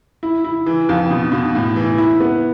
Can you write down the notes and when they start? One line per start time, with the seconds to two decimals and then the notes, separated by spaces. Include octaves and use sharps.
0.23 E4
0.44 E4
0.66 E3
0.89 F2
1.10 B2
1.32 B2
1.55 A2
1.76 E3
1.98 E4
2.20 B3